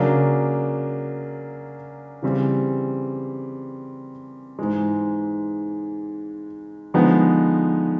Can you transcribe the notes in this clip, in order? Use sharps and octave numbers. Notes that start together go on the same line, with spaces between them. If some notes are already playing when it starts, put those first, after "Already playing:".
Already playing: C#3 F#3 A#3 D4
C#3 E3 G3 C4
G#2 E3 G#3
D3 F3 G#3 B3 D#4